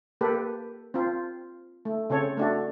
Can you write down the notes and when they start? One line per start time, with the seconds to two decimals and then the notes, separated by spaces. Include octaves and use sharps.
0.21 A#3 G4 A4 B4
0.94 C4 F4
1.85 A3
2.10 C#3 C4 A4 C#5
2.37 A3 D4 F#4